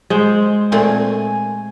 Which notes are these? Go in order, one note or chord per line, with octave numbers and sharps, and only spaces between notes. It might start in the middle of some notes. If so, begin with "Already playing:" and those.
G#3 C5
A#2 A3 C4 G#5